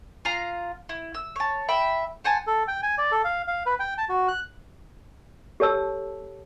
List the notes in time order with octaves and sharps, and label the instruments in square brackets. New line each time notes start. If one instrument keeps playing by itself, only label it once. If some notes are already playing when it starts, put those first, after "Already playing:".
[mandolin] F4 F5 A#5
E4
E6
C#5 A5
E5 G5 B5
C5 F#5 G#5 A5
[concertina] A4
G5
G#5
D5
A4
F5
F5
B4
G5
A5
F#4
F#6
[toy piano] G4 A4 C#5 A5 E6